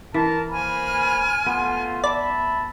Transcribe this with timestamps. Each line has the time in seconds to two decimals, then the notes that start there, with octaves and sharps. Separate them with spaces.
0.14 E3 A#4 A5
0.50 A#3 C5 G#5 B5 F6
1.46 A3 B3 F4
2.04 D5 E5 A5 B5